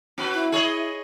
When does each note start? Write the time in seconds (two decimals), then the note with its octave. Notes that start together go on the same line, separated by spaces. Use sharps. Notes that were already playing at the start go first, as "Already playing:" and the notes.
0.18 C4 F#4 B4
0.34 E4
0.52 G#4 C#5 D#5